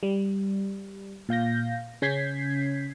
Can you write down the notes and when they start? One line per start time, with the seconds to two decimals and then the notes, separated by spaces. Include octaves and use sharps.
0.03 G3
1.29 A#2 F5 G6 A#6
2.02 C#3 C#4 G6 G#6 B6 C7